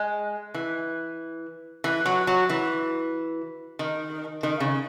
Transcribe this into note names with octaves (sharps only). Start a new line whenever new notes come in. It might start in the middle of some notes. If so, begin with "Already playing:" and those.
Already playing: G#3
E3
E3
F#3
F#3
E3
D#3
D#3
C#3